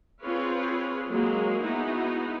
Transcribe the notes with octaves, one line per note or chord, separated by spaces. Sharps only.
C4 F4 G#4 B4 C#5
F#3 G#3 A#3 G#4
B3 D#4 E4 F#4 G#4